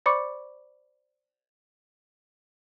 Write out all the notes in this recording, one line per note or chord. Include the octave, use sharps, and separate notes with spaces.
C5 D5 B5 C#6 D6 C#7